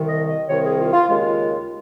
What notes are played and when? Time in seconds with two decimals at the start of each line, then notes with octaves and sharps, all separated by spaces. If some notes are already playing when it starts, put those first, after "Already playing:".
Already playing: C2 C3 D#3
0.09 D#5
0.28 D#5
0.48 C2 C3 D#3 C#5
0.63 G#4
0.78 F4
0.93 F4
1.08 D#2 C#3 G#3 F4